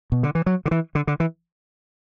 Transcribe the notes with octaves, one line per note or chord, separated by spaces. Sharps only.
B2
D3
E3
F#3
D3
E3
D3
D3
E3